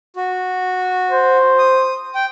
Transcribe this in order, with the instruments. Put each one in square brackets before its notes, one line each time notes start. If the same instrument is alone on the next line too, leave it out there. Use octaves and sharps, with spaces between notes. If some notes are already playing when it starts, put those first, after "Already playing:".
[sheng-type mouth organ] F#4
[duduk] C5
[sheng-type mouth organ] D#6
G5